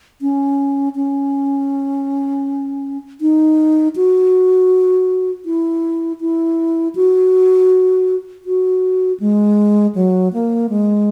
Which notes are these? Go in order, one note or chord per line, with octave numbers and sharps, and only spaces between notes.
C#4
C#4
D#4
F#4
E4
E4
F#4
F#4
G#3
F#3
A#3
G#3